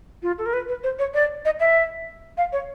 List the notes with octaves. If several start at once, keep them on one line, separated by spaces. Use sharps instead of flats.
F4
A4
A#4
B4
B4
C5
C#5
D5
D#5
E5
F5
C#5